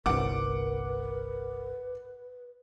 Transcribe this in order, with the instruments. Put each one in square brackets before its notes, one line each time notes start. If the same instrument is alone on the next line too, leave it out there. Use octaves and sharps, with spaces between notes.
[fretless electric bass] G1 C2 [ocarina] A#4 [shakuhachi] B4 [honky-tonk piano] F#5 D6